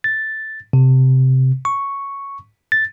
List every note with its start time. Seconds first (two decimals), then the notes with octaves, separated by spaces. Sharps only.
0.04 A6
0.73 C3
1.65 C#6
2.72 A6